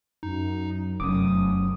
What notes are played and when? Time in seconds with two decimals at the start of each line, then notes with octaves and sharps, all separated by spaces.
0.23 F#2 D#4
1.00 F1 F#2 D6 D#6